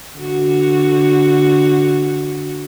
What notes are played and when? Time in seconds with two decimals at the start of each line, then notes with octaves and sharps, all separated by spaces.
0.17 D3 F#4